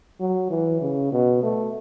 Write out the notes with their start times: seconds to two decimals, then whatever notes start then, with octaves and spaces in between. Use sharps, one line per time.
0.20 F#3
0.50 E3
0.81 C#3
1.12 B2
1.43 A3